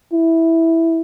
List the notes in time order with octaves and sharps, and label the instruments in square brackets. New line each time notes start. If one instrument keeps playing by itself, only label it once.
[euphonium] E4